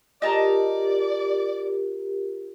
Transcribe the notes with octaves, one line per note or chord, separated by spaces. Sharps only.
F4 G4 A#4 D5 D#5 A5 A#5